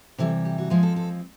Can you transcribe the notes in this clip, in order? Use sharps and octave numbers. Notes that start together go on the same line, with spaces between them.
C3 E3 G3 A4
G4
F#4
F3 G#3 C4 G#4
A4
A4